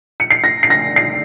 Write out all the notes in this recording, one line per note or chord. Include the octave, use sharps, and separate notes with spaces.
C#7
C7
A#6
C7
A#6
C7